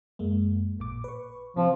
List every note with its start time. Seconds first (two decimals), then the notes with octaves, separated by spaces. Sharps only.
0.19 F#2 G#3 A#3
0.79 A1 A#2 D6
1.04 B4 C#6
1.56 C3 F3 C4